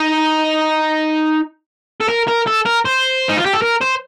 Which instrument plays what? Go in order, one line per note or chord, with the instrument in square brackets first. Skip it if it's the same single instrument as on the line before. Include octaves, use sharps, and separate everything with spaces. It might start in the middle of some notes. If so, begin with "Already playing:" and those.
Already playing: [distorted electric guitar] D#4
A4
A#4
A#4
A4
A#4
C5
D#4
F4
G4
A4
A#4
C5